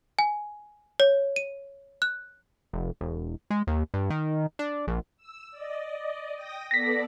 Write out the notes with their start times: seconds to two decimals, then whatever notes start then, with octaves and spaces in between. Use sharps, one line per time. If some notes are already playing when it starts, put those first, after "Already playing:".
0.19 G#5
1.00 C#5
1.36 D#7
2.02 F#6
2.73 F1
3.01 E1
3.50 G#3
3.67 D#2
3.94 G2
4.10 D#3
4.59 D4
4.88 A#1
5.17 E6
5.51 D5 D#5
6.36 G5 D#6 A#6
6.71 B3 A4 D5 A#6 B6